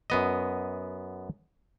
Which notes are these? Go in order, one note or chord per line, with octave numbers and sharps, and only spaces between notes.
F#2 B3 D#5